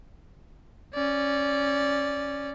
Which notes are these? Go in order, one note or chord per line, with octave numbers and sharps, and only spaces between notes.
C#4 D5